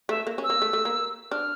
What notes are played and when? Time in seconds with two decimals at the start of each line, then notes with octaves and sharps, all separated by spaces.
0.09 A3 E5
0.27 A#3
0.38 C#4
0.44 E6
0.50 A#3
0.62 A3
0.73 A3
0.85 A#3
1.31 D4 F6